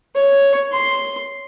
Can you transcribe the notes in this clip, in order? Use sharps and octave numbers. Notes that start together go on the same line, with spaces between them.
C#5
C6